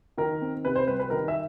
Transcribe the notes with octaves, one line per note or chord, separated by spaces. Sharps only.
D#3 A#4
C4
C3 B4
C5
G3 B4
B4
D#3 A#4
E5